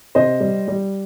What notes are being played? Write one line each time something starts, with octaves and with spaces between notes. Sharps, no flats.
C3 C5 D#5
G3
G3